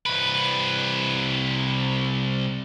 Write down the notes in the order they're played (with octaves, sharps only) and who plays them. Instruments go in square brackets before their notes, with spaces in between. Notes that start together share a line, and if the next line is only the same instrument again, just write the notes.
[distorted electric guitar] C2 B4